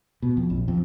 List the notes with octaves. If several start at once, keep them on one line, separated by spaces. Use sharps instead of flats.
B2
F2
A#1
F2